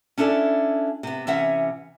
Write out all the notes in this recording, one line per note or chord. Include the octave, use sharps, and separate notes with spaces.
C#4 D4 E4 A4 D5
C3 B3
C3 E3 C#4 E5 F#5